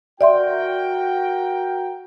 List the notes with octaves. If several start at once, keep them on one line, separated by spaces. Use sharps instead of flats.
F#4 A#4 D5 E5 G5 C6